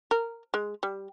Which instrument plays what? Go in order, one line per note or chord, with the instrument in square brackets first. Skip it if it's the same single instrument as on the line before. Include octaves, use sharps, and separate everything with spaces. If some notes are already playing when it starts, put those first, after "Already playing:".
[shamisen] A#4
G#3
G3